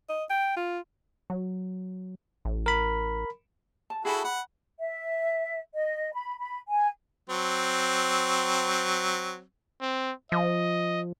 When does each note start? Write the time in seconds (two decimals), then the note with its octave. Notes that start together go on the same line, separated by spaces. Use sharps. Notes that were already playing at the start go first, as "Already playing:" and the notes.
0.09 D#5
0.30 G5
0.57 F4
1.30 F#3
2.45 A1
2.66 A#4 B5
3.90 A5
4.05 E4 F#4 G#4 A4 G5 B5
4.24 F#5 B5
4.79 E5
5.73 D#5
6.12 B5
6.38 B5
6.68 G#5
7.30 F#3 C4
9.81 C4
10.32 F3 D#5